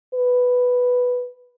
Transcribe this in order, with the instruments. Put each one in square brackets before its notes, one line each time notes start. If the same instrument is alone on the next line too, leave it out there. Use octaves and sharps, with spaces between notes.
[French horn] B4